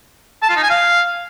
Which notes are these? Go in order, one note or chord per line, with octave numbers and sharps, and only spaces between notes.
A5
F4
D#4
G#5
F5